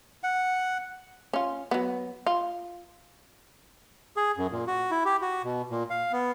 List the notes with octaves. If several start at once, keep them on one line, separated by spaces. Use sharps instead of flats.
F#5
C#4 F4
F#3 B3
F4
G#4
F#2
A#2
F#4
E4
G4
F#4
B2
A#2
F5
B3